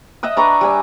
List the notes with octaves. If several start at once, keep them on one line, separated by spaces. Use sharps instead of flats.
D#5 E5 F#5 D#6
D4 B4 A#5 C#6
G3 G#5 E6